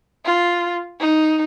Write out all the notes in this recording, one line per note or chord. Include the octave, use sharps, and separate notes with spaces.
F4
D#4